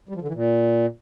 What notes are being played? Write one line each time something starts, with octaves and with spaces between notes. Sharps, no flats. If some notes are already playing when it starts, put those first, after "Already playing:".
G3
F3
D3
E3
A#2